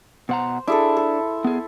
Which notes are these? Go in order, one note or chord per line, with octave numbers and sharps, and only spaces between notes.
B2 C5 F#5 A#5
D4 E4 G#4 A4
A4
B3 G#4